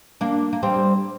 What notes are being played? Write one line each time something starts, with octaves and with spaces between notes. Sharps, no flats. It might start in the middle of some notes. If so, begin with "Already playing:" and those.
A#3 D4
A#3
G3 C4